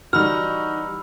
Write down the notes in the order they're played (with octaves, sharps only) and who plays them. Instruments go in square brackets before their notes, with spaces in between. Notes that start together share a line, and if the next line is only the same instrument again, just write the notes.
[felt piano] E3 G3 [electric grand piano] D#4 F#4 [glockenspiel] B5 E6 [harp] F6